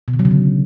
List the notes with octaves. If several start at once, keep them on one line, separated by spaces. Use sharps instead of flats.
B2
D3
F#3
C#3
D3